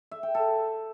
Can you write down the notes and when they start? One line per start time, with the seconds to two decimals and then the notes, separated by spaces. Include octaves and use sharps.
0.11 E5
0.23 G5
0.35 A4